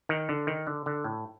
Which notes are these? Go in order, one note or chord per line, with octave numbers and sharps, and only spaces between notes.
D#3
D3
D#3
D3
D3
A2